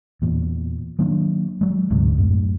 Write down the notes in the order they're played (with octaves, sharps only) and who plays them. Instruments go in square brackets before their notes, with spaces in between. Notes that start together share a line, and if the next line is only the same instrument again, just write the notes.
[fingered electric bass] E2 A#2
D#3 F#3 A#3 D4
F#3 G#3
D1 D2 G#2 C3
F#2 A2